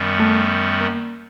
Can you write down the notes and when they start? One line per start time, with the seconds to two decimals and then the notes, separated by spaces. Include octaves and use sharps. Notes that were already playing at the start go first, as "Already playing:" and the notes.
Already playing: F#2 D#3 G3 B3
0.20 A3
0.81 A#3